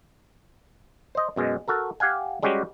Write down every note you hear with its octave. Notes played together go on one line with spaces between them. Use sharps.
C5 D#5
F#2 B2 G#3
F#4 A4 A#4
G4 F5 F#5 G#5
G3 G#3 C#4 F#4 G4